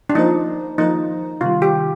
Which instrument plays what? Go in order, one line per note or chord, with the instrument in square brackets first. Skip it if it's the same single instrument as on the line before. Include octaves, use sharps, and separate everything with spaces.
[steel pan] D4
[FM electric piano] F3 A#3 F4 C5 [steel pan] D#4
[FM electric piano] F3 A#3 F4 C5 [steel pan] D#4
[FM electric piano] C3 D#3 G3 [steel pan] F4
[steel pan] G4